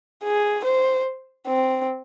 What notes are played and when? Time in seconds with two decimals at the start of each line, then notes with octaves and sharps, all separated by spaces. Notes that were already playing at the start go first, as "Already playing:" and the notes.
0.24 G#4
0.65 C5
1.48 C4